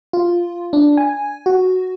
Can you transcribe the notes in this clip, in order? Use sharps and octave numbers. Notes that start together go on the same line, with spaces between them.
F4
D4
G#5
F#4